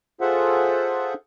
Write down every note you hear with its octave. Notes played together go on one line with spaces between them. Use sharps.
F4 G#4 A4 C5 E5 F#5